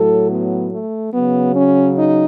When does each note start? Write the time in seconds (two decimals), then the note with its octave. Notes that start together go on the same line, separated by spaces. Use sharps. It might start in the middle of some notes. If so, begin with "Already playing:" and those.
Already playing: A2 F#3 A4
0.31 B3
0.73 A3
1.14 C#3 F#3 B3
1.55 C#4
1.97 D#4